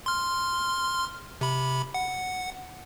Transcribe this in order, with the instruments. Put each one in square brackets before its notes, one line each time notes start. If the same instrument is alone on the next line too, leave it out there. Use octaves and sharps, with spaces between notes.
[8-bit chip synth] C6 F6
C3 B5
F#5